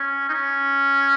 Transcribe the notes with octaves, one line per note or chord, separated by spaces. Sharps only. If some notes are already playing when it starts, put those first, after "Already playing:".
Already playing: C#4
D#4
C#4